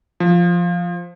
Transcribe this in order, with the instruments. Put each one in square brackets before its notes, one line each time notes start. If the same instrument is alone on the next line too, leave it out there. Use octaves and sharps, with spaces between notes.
[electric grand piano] F3